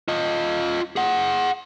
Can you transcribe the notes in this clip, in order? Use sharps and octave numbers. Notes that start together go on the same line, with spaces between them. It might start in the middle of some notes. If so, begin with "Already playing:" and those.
F4 D#5
G#4 F#5